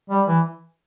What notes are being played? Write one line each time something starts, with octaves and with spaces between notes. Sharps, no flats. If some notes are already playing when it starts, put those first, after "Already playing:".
G3
E3